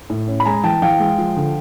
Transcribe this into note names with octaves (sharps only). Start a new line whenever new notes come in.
A2
C#4
B5
G#3 G#5 A#5
E3 G5 A5
E3 F5 G5
G#3
F3
D3